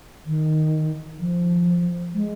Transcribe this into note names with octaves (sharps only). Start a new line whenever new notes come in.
D#3
F3
G#3